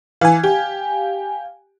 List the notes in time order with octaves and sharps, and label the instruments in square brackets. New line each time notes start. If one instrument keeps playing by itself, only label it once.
[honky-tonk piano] E3 [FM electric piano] F5 G#5
[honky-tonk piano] G4